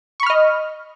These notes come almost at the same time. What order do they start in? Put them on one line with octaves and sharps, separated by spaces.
C#6 B5 F6 D#5